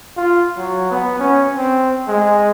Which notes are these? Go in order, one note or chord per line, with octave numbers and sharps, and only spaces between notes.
F4
F#3
B3
C#4
C4
G#3